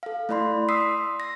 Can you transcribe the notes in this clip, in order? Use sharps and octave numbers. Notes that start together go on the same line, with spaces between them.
A4 F5
A3 E4 D5 B5 C6
C6 D#6 E6 B6 C7
A#6